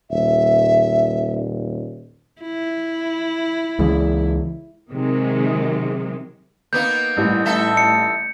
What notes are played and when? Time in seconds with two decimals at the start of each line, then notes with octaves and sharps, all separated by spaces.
0.10 D#1 E5
2.42 E4
3.79 C#2 E3 G#3
4.90 C3 D#3 F#3 G#3
6.73 A#3 B3 D#4 G6
7.17 A1 G3
7.45 D#4 A4 E5
7.77 C#7